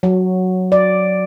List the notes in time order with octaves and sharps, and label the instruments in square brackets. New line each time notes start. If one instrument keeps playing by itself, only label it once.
[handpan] F#3
D5